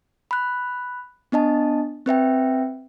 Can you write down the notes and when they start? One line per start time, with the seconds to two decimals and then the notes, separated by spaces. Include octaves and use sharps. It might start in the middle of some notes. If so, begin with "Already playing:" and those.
0.31 B5 F#6
1.32 B3 D4 D#5 A5
2.06 C4 B4 E5 G5